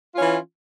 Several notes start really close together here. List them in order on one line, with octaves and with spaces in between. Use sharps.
F4 C#4 E3